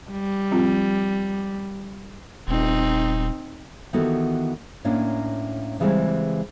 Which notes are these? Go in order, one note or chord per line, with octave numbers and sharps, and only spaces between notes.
G3
F3 C4 F4
D#1 C4 D#4
D#3 E3 B3 F#4 G4 A4
A2 A#3 C#4 D4
C#3 E3 G3 G#3 C4